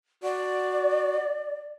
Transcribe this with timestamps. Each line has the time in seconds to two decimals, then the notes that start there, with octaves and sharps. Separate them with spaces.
0.23 F#4 D5